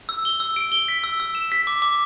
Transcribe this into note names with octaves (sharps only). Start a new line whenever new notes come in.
E6
G7
E6
D7
G7
B6
E6
E6
E7
B6
D6
D6